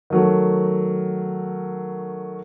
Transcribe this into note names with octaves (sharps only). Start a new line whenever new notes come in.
D#3 F#3 A3